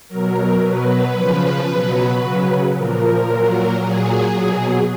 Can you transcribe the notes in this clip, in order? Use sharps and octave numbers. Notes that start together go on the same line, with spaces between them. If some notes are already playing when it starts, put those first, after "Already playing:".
B2 F#3 A#4
B2 F#3 B4
C#3 F3
B2 F#3
C#3 F#3
A#2 F3 A#4
A#2 F#3
A#2 F#3 G#4
B2 F#3